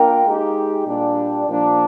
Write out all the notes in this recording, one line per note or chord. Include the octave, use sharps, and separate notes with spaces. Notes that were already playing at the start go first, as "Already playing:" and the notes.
Already playing: A#3 D4 F4 A#4 G5
G#3 D#4 G4
A#2 G3 D4
A#2 F3 A#3 D4